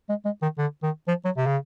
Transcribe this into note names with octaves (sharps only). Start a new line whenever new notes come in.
G#3
G#3
D#3
D3
D#3
F3
F#3
C3
C#3